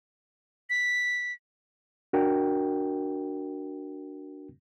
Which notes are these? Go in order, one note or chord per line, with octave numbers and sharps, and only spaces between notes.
B6
D4 F#4 A#4 G5